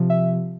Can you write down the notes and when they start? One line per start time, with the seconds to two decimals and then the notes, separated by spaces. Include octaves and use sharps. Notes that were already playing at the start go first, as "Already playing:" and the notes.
Already playing: C3 F3
0.10 E5